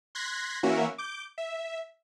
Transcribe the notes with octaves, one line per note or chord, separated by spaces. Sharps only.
C6 F#6 G#6 A#6 B6
E3 A#3 C#4 F#4 A#4 E5
D6 G6
E5